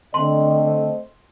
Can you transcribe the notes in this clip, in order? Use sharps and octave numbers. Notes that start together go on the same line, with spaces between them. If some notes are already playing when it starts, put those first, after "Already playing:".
D3 A3 C4 D#5 C6